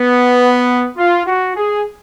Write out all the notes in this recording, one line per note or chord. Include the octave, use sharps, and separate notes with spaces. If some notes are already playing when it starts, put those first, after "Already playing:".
Already playing: B3
F4
F#4
G#4